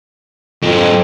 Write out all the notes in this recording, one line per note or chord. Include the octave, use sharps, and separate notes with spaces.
F2 G#2 F#3